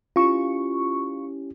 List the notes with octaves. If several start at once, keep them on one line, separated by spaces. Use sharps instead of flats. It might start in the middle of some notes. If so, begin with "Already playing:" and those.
C#4 E4 F4 G4 C#6